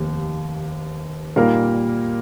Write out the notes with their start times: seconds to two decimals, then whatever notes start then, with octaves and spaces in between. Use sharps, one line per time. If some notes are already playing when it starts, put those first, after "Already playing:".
Already playing: F1 D#2 D#3 A#3 G4
1.36 A#2 G3 A#3 D#4 A#4